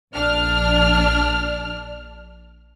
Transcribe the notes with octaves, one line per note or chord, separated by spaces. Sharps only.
A#1 D4 F6